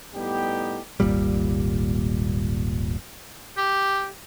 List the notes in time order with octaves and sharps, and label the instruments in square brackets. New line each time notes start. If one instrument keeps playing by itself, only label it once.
[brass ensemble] A2 G3 B3 D#4 G4
[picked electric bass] D#1 G#1 A#2 G3
[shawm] G4